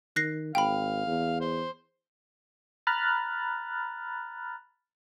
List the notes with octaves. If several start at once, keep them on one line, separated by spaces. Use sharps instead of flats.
D#3 F#6 A#6 C7
G#1 F5 G5 B5
E2
C5
A#5 B5 F6 F#6 A6